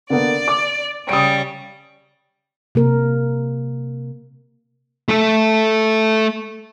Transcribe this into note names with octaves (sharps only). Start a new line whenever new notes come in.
D3 A#3 B3 D5
D6
C#3 G3 D#6 D7
C3 A#3 A#4
A3 A4